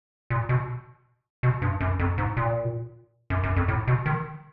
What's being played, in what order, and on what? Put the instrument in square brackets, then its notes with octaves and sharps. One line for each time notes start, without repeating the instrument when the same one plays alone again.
[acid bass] A#2
B2
B2
G2
F#2
F2
G#2
A#2
F#2
F#2
F2
A2
B2
D#3